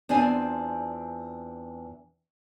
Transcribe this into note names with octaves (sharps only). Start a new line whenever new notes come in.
E2 C4 D4 F4 D5 G#5